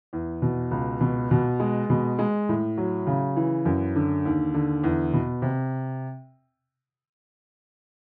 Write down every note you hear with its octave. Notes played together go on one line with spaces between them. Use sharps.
E2
B2
C#2
B2
B2
G#3
B2
G#3
A2
F#3
C#3
E3
F#2
D3
D#2
D3
E2
B2
C3